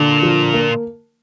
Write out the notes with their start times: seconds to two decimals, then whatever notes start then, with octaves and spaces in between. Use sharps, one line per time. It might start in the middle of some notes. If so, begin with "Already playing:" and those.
Already playing: A#2 D3
0.23 F3
0.54 A#3